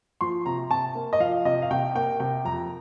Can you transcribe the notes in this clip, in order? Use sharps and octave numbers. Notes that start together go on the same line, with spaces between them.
F3 C6
C3 A#5
C3 A5
A#3
D#5
F3 F5
C3 D#5
F5
C3 G5
A#3 G5
C3 G5
F2 A#5